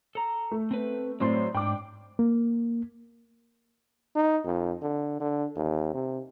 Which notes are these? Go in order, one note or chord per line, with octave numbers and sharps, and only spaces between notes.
A4 A#5
A3
C4 B4
A2 F#3 C4 C5 D5 C6
G#2 D4 G5 D6
A#3
D#4
F2
D3
D3
D#2
C3